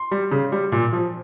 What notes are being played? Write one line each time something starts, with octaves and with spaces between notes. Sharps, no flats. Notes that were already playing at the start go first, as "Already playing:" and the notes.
Already playing: C6
G3
C#3
G3
A#2
F3